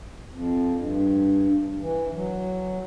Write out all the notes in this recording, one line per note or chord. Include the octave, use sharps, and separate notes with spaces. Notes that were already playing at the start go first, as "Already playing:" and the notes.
F2
G2
E3
F#3